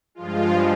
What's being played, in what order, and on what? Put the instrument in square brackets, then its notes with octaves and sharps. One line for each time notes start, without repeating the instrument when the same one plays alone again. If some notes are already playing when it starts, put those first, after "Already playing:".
[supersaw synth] G2 F3 G#3 F4